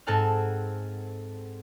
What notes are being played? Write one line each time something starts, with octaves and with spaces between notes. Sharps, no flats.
G#2 C4 A4 F#5 G#5 F6